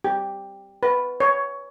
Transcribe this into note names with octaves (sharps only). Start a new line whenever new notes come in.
G4
B4
C#5